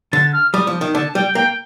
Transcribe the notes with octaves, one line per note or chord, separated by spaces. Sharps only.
D3 A6
F6
G3 D#6
F3
D#3
D3 A5
G3 G5
A#3 G5